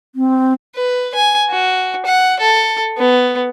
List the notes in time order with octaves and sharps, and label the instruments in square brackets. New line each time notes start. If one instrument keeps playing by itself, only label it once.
[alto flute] C4
[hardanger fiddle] B4
G#5
F#4
F#5
A4
B3